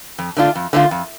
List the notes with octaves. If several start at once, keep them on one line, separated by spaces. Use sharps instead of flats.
F2
D3 A3 D4 F4
F2
D3 A3 D4 F4
F2